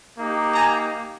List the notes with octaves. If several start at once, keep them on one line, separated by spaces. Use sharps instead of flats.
A#3 D#4 G4
G#5 A#5